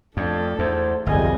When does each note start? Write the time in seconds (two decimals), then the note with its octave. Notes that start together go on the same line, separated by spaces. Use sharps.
0.17 F2 A3 D4 A4
0.59 E2 C5
1.06 G1 C2 F2 G3 G#4 D#5 G#5